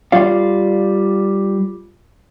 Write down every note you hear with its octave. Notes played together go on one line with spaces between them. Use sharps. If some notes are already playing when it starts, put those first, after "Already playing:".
G3 F4 D5 F5